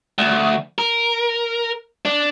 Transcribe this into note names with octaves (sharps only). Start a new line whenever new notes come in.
D2
A#4
D4